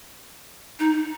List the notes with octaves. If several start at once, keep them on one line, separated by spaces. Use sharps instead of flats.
D#4